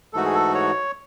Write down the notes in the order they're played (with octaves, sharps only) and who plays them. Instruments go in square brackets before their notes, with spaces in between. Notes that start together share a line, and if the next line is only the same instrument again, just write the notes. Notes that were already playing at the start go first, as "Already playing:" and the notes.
[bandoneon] G#2 E3 A3 D#4 F#4 [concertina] A4
[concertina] G#4
A4
C#5